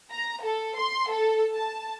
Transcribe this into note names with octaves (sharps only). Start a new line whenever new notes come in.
A#5
A4
C6
A4
A5